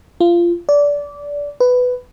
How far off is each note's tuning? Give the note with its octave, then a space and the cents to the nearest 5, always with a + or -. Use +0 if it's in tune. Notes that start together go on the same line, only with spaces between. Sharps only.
F4 -20
D5 -20
B4 +10